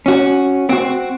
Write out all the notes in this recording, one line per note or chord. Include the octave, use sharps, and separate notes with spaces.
C#4 F#4
C4 F#4